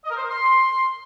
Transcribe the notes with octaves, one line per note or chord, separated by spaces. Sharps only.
D#5
A#4
C5
A#4
C6